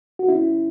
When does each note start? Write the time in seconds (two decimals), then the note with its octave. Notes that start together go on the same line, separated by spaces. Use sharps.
0.19 F#4
0.29 C#4 E4